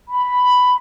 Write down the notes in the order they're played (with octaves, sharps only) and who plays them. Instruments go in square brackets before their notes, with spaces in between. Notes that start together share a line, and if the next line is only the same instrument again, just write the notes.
[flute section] B5